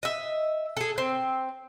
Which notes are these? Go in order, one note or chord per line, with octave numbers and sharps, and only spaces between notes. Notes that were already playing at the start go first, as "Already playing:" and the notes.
D#5 E5
G#4 A4
C4